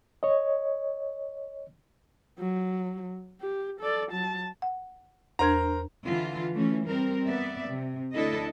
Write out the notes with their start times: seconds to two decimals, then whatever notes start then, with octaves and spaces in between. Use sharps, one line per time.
0.23 C#5 D#5
2.39 F#3
3.41 G4
3.81 A4 D5
4.12 F#3 A5
4.62 F#5
5.39 E2 D4 A#4 C5 A#5 G#6
6.05 D3 E3 F4
6.52 E3 A3 C#4
6.85 G3 C4 A#4
7.27 B3 D5 E5
7.70 C3
8.14 D2 D4 E4 A4 D#5